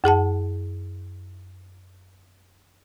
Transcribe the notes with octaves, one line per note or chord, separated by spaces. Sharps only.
F#2 G#4 F#5 A5